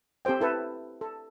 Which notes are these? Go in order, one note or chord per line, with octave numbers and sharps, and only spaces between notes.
C4 G4 A4 C5 G5
E4 A4 B4
A4